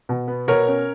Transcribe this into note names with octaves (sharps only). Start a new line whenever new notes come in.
B2
B3
B2 A#4 C#5
C#4